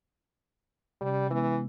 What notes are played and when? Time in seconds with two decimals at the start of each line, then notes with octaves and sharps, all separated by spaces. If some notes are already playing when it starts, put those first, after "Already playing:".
1.01 C3 G3 C#4
1.30 E3 G#3 B3 E6